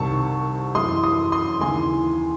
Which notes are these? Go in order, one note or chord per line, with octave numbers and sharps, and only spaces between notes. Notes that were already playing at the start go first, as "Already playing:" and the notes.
Already playing: C2 C3 D#3 A5 C#6
F#2 E3 C6 D#6
C6 D#6
C6 D#6
D#2 C#3 E3 G#5 C6